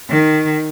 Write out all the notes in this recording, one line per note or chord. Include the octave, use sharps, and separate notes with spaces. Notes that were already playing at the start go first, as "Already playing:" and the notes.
D#3